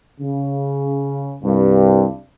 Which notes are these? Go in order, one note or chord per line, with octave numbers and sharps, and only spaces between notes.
C#3
C2 G2